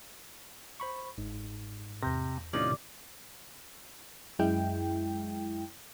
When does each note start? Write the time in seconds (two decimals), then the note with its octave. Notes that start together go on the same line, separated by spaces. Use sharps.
0.80 C5 B5 C#6
1.18 G1 G#2
2.03 E2 C3 G6 A#6
2.53 A2 C3 D#3 C#4 D#4 F4 D5
4.39 F#2 G#3 E4 G5